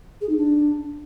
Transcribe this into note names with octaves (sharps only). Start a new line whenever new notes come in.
G#4
D#4
D4